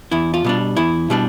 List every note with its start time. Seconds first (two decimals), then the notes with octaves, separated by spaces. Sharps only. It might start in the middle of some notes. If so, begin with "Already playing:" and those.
0.12 E2 E4
0.34 F4
0.44 B2 G3 D4
0.77 E2 E4
1.10 B2 G3 D4